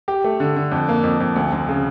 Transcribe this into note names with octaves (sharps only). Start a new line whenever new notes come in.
G4
A3
D3
D3
F2
A#3
F2
F2
D2
D2
C#3